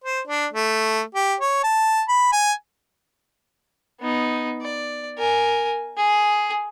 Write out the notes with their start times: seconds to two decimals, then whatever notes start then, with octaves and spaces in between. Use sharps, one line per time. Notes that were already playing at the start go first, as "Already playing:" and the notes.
0.04 C5
0.27 D4
0.53 A3
1.15 G4
1.40 C#5
1.63 A5
2.08 B5
2.33 G#5
4.00 B3 D#4
4.62 D5
5.18 A#4 G#5
5.97 G#4